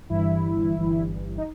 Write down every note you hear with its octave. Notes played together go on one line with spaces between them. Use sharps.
G1 G2 E3 G3 E4
G1 G2 E3 G3
D#4